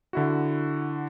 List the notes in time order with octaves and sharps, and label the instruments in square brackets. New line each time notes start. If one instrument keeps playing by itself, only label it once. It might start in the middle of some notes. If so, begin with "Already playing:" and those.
[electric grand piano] D3 E4 F#4